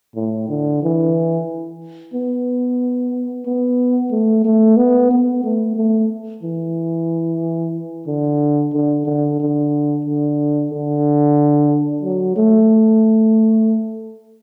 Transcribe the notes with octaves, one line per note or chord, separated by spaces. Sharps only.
A2
D3
E3
B3
B3
A3
A3
B3
B3
A3
A3
E3
D3
D3
D3
D3
D3
D3
F#3
A3